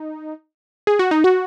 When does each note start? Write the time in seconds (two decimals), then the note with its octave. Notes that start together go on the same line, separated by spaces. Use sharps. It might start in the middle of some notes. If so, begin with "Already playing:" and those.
Already playing: D#4
0.87 G#4
0.99 F#4
1.11 D#4
1.24 F#4